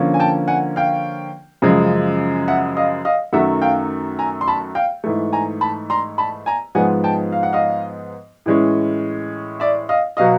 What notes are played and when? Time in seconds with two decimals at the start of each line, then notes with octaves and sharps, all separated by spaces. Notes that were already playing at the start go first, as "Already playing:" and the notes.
Already playing: D3 F3 A#3 C#4
0.14 G#5
0.20 G5 A5
0.48 F#5 G#5
0.76 F5 G5
1.62 F#2 C#3 F3 G#3
2.48 E5 F#5
2.77 D#5 F5
3.05 D#5 F5
3.33 F#2 D#3 F#3 A3 E5 F#5
3.62 F5 G5
4.19 G#5 A#5
4.41 C6
4.48 A5 B5
4.75 F5 G5
5.04 G#2 E3 A3
5.33 G#5 A#5
5.61 A5 B5
5.90 A#5 C6
6.18 A5 B5
6.46 G#5 A#5
6.75 G#2 F3 G#3 B3 F#5 G#5
7.04 G5 A5
7.32 F5
7.43 F#5
7.53 D#5 F5
8.46 A2 E3 G#3 C#4
9.60 D5 E5
9.89 D#5 F5
10.17 B2 F#3 D#5 F5